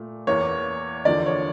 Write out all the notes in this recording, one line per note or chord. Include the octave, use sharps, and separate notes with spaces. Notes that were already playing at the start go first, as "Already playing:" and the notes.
Already playing: A#2 A3
E2 E3 A#3 C#5
E2 D3 F3 A#3 D5
C#5